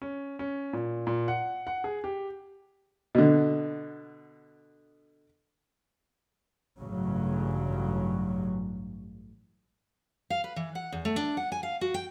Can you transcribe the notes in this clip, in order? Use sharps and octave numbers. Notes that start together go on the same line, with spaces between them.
C#4
C#4
A#2
A#2
F#5
F#5
G#4
G4
B2 D3
A1 G2 C#3 F#3
F5
B4
E3
F#5
E2
A3
D4
F#5
G#5
F5
F#4
G5